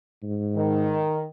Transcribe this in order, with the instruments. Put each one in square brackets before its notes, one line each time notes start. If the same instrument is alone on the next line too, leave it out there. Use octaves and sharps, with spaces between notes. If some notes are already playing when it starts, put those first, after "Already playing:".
[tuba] G#2
[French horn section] D#3